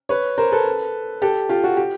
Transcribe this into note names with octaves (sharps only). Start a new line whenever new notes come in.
B4 C#5
A#4 C5
A4 B4
G4 A4
F4 G4
F#4
G4